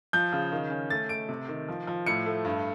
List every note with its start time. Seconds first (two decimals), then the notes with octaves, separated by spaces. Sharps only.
0.13 F3 G6
0.33 C#3
0.52 D#3
0.70 C#4
0.90 A3 A6
1.09 A3 D7
1.29 C3
1.48 D#3
1.68 F3
1.87 F3
2.06 A2 C#7
2.26 A3
2.45 G2